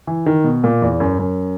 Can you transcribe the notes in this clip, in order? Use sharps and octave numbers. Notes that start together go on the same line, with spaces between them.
E3
D#3
B2
A#2
E2
F#2
F#2